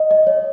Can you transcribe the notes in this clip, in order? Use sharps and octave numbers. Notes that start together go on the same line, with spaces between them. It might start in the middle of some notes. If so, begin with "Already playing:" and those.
Already playing: D#5
D#5
C#5